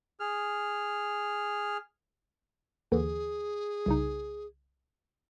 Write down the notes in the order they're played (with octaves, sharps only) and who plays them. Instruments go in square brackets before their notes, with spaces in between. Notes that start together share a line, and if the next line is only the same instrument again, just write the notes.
[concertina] G#4 F6
[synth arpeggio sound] D#2 D3 E3 [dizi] G#4
[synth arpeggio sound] C2 C#3 D#4